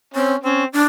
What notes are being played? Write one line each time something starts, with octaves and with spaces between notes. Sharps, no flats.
C4 C#4
C4 C#4
D4